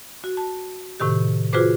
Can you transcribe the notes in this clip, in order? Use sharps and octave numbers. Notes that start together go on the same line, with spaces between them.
F#4
A5
A2 C3 D#3 G4
F4 F#4 G#4 B4 C5 D6